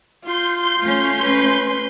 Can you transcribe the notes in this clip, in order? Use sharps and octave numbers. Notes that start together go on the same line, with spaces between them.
F4 C6 G6
A3 C#4 F4
B4